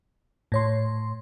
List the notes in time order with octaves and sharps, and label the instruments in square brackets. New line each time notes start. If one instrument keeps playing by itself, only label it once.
[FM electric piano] A2 C#5 C6